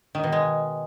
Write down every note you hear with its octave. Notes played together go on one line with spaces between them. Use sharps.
D#3
B2
G#3